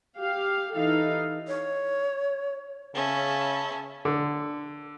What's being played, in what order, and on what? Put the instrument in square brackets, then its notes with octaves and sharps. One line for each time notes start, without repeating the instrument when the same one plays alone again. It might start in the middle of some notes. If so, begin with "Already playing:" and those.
[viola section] G4 F5
E3 D#4 A4 F5
[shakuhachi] C#5
[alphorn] C#3 [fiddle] C#4 [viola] E5 A5
[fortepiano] D3